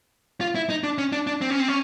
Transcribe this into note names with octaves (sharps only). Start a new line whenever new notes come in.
F4
E4
D#4
D4
C#4
D4
D4
C4
C#4
C4
C#4